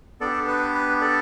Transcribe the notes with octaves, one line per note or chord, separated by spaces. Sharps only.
B3 D4 G4 A4 D5
B4
B4
A4 D5